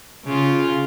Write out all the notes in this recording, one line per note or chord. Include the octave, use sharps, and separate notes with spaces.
C#3 F4